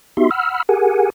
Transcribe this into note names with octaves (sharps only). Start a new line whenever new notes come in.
B3 D#4 F#4 G4 E5 C6
F#5 B5 E6 F6
G4 G#4 A#4 F#5 G#5